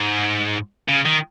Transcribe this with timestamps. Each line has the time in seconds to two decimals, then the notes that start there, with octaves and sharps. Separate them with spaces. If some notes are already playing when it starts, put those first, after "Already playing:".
Already playing: G#2
0.89 C#3
1.06 D#3